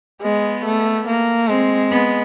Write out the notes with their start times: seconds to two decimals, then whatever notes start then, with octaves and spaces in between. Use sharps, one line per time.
0.22 G#3 B3
0.65 A3
1.07 A#3
1.48 G#3 C4
1.91 B3